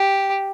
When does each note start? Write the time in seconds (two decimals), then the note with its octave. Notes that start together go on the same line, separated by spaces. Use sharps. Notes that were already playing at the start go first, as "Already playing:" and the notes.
Already playing: G4